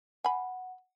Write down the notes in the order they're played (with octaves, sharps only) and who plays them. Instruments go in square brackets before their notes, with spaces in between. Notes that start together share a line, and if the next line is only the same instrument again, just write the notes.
[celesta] F#5 [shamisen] G#5 B5